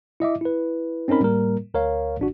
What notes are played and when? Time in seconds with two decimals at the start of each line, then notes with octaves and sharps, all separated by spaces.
0.20 E4 D#5 E5 D6
0.41 E4 B4
1.08 C4 C#4 D#4 A#4 B5
1.20 A2 G3 A#3 A#4
1.74 D2 A#4 C#5 F5
2.20 A1 D4 F#4